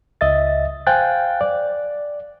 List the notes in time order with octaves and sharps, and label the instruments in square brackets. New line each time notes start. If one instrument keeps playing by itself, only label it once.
[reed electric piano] C#2 D#5 E5 A6
C5 F5 G5 G#5 F#6 A6
D5